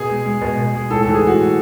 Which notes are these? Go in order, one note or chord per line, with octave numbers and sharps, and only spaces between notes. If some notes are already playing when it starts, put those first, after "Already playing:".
Already playing: B2 G#4
G#3
G#3
B2
B2
G#3
A2 A4
E3 A4
G#4
A2 F#4
G#3